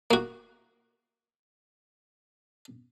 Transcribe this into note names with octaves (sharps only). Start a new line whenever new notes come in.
A#3 F#4